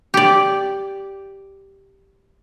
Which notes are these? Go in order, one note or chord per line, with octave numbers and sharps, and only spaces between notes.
G4 D5